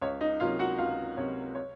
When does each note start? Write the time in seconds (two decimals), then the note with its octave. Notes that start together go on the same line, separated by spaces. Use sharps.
0.02 C#2 C#5
0.21 D#4 D#5
0.40 C3 F#3 A#3 C#4 F4 F5
0.59 F#4 F#5
0.79 C#2 F4 F5
1.17 C3 F#3 A#3 C#4 C#5
1.55 C#5